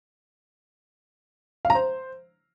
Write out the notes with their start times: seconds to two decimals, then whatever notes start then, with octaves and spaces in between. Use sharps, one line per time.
1.65 F5
1.70 A#5
1.75 C5